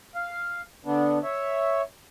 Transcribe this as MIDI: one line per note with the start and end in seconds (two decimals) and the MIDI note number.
0.15 0.61 77
0.85 1.19 50
0.85 1.19 59
0.85 1.19 62
1.23 1.82 73
1.23 1.82 76